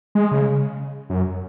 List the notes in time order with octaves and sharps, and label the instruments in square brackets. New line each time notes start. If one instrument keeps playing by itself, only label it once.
[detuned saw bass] G#3
C#3
F#2